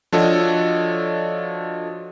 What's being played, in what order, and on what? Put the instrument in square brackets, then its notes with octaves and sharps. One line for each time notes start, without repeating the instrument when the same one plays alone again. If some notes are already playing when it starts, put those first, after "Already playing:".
[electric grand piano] F3 D4 F#4 A4 C#5 D#5